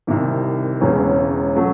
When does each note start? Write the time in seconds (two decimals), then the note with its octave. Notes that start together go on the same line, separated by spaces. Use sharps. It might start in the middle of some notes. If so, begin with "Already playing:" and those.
0.07 C2 C3 D#3
0.81 E1 E2 C#3 G#3 C#4
1.56 C#3 F#3 A3